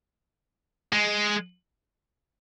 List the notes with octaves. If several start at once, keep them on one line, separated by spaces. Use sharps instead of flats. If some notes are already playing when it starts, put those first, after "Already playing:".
G#3